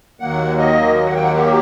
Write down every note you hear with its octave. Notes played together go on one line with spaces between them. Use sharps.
D#2 D#3 F#3 A#3 F#5
D#5
D#5
F#5
G5
F#5
G4